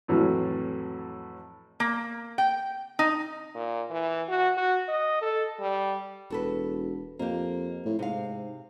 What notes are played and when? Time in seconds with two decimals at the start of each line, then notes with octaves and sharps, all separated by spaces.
0.08 F2 A2 E3 F#3
1.80 A#3
2.38 G5
2.99 D#4
3.55 A#2
3.90 E3
4.29 F#4
4.57 F#4
4.88 D#5
5.21 A4
5.60 G3
6.30 E1 F#4 A4 B4
7.19 F2 A#3 G4
7.86 A2
7.99 G#2 C3 F5